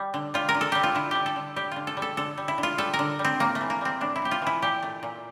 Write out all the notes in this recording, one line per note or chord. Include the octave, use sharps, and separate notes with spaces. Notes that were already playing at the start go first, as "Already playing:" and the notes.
Already playing: G3
D3
G3 F4
A#4
D3
A4
G3 G4
F4
D3 E4
G3 G4
A4
D3
G3 G4
D3 F4
A4
G3
A4
D3 A4
G3
E4
D3
F4
G3 A4
A#4
D3
G3
C4
A2 A#3
A3
E3
A#3
G3 C4
A2 D4
E4
A2 G4
F4
E3 E4
A#2 G4
A3
A#2